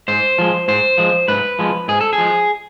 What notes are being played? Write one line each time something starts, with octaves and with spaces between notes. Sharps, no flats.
G#2 C5
F3 G#3
G#2 C5
F3 G#3
G#2 B4
F3 G#3
G#2 G#4
A4
G#4
F3 G#3